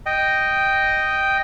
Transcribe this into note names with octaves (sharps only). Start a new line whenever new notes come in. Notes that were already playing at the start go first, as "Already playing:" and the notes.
D#5 G5